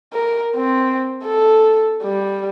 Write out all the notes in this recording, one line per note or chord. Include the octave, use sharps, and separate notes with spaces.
A#4
C4
A4
G3